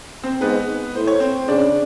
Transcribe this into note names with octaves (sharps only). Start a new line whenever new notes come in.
C4 C5
G#2 B3 B4
A2 C5
C#5
C4 C5
C#3 D4 D5